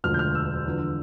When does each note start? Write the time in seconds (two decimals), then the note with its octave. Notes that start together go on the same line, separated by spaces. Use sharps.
0.04 E1 D2 D3 F3 F6
0.14 G6
0.19 F6
0.35 E6
0.66 E2 D3 F3